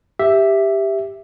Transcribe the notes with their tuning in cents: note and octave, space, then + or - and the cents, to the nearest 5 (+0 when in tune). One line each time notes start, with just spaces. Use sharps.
G4 +5 E5 +0